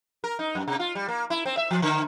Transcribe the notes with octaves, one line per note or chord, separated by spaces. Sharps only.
A#4
D#4
F#2
C3
F4
G3
A#3
E4
C4
E5
F3
D3